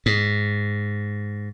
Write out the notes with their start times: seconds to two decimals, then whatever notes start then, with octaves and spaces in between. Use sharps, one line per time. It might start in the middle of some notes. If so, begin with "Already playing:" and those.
0.06 G#2